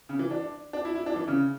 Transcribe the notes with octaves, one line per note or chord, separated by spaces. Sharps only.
C#3
E3
D4
D4
E4
E4
D4
E3
C#3